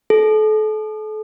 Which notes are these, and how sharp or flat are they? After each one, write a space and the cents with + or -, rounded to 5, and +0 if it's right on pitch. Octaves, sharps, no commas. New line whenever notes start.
A4 -35